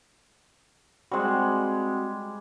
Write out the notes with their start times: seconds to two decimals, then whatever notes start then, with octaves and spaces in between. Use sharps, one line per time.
1.12 G3 G#3 C4 F#4